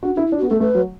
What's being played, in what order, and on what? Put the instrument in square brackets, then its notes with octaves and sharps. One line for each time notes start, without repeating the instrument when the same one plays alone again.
[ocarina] D4 [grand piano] F#4
[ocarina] D4 [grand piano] E4
[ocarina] E4
[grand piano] D4
[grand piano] B3 [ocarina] F#4
[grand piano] A3 [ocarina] A4
[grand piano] A3 [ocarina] B4
[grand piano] F#3